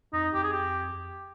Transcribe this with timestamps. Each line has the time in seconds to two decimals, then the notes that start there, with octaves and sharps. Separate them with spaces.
0.13 F2 D#4
0.34 F2 G4
0.43 G#4
0.52 G4